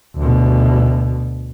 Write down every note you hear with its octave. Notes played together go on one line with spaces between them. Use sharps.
D2 B2